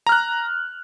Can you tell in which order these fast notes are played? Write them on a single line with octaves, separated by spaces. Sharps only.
A#5 F6 F#6